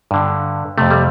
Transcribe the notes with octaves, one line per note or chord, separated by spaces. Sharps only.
G2 D3
F2 C3 A3
G3